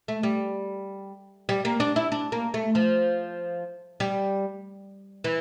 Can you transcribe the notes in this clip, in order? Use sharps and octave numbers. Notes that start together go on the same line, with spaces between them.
A3
G3
G3
A#3
D4
E4
D4
A#3
A3
F3
G3
E3